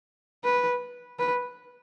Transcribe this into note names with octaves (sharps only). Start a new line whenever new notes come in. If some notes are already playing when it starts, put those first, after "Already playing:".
B4
B4